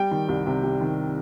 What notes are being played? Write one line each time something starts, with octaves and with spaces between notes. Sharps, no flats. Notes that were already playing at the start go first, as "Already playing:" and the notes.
Already playing: G3 G5
D#3
C2
C3
G3
D#3